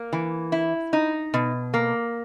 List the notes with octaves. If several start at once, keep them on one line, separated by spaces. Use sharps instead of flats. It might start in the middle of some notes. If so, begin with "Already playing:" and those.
Already playing: A#3
E3
E4
D#4
B2
A#3